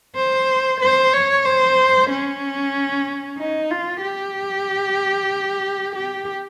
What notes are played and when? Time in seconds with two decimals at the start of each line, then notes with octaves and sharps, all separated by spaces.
0.16 C5
0.80 C5
1.13 C#5
1.45 C5
2.10 C#4
3.38 D#4
3.70 F4
4.02 G4
5.95 G4